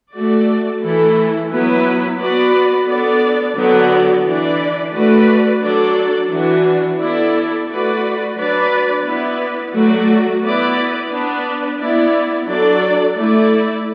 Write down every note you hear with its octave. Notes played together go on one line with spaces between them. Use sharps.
A3 F#4 D5
E3 A3 E4 A4
F#3 B3 E4 B4
B3 F#4 B4 D5
B3 D4 A4 D5
D3 F#3 B3 F#4 D5
E3 D4 B4 D5
A3 F#4 B4 D5
F#3 D4 A4 D5
E3 D4 F#4
B3 E4 A4 D5
A3 F#4 B4 D5
F#3 D4 B4 D5
B3 E4 B4 D5
F#3 A3 F#4 D5
B3 E4 B4 D5
B3 D4 B4 D5
B3 E4 D5
F#3 D4 A4 D5
A3 E4 D5